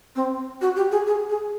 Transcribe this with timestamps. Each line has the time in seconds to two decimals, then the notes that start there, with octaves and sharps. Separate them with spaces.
0.16 C4
0.61 F#4
0.76 G4
0.91 G#4
1.07 G#4
1.30 G#4